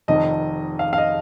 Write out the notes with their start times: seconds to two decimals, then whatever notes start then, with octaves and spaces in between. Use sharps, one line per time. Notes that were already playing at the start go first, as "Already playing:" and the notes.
0.08 F1 F2 D#3 D#5
0.79 F5
0.93 F5
0.98 D#5